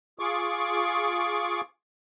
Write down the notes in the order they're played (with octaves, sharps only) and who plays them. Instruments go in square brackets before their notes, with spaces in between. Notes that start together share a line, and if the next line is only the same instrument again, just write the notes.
[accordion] F4 G#4 C#6 D6